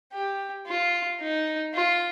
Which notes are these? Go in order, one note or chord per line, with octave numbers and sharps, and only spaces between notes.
G4
F4
D#4
F4